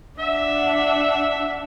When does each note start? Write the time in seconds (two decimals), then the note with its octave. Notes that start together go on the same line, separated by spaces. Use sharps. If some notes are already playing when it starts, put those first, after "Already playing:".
0.19 D4 E5 F#5